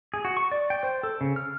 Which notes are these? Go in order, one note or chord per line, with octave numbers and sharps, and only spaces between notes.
G#4
F#4
C#6
D5
G5
C5
A4
C#3
F6